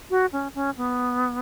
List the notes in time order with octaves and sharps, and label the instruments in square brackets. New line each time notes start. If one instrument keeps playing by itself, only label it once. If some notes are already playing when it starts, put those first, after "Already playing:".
[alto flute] F#4
C#4
C#4
B3